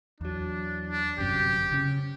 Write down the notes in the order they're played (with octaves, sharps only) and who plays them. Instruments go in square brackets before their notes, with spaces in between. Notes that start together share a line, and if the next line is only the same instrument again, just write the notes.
[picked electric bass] E2 F#3 [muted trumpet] D4
[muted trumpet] D4
[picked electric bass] G1 F#2 C3 [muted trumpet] G4
[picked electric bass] C#3 C#4